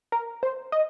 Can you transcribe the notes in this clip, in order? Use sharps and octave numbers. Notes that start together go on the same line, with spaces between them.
A#4
C5
D#5